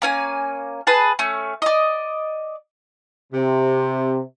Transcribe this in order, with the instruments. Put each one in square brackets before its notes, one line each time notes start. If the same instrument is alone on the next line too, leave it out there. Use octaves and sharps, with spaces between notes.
[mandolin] A#3 C#4 G#5
G#4 B4 A5
A3 C#4
D5 D#5
[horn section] C3